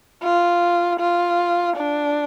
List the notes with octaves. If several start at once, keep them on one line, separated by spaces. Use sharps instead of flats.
F4
F4
D4